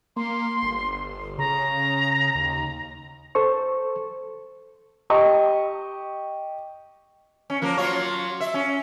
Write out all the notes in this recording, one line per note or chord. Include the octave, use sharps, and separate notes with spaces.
A#3 C6
G1
C#3 A#5
D#2
A4 C5 C#6
G4 D#5 C#6
C#4
F3 A#3 A#4
F#3 F4 C#5
E5
C#4